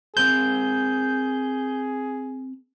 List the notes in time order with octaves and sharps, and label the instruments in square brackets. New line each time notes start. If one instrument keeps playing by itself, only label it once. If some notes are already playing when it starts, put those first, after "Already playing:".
[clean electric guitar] C4 A#4 C5 [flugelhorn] G#4 [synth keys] G6